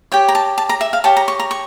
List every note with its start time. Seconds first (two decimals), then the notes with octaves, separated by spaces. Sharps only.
0.12 G4 C#5 G5
0.28 A#5
0.35 A5
0.58 A5
0.69 A#5
0.81 E5
0.93 F5
1.04 G4 C#5 A5
1.17 A#5
1.28 C#6
1.39 A#5
1.51 C#6